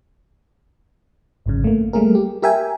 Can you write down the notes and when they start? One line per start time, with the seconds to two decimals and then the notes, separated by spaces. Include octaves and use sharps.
1.46 G#1 F#2 C#3
1.64 A3 A#3
1.93 G3 A3 A#3 G#4 A#4
2.15 G4
2.42 G4 A#4 E5 G5 G#5